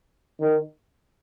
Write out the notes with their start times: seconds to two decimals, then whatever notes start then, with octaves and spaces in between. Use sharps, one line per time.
0.40 D#3